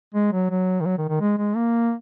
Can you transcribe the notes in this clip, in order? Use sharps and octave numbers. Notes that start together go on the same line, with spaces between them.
G#3
F#3
F#3
D#3
F#3
D#3
D#3
G#3
G#3
A#3